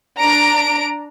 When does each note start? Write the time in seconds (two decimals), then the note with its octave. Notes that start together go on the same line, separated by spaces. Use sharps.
0.18 D4 A#5 D7